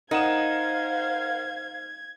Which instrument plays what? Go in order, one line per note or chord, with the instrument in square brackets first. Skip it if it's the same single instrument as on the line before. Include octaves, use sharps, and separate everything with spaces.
[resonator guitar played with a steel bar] D#4 [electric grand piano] A#4 F#5 E7 [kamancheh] C5 F5 [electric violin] G#6